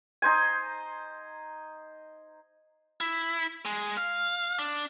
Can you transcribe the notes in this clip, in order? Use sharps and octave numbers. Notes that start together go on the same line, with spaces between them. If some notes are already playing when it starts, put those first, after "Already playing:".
D#4 C5 G#5
E4
G#3
F5
D4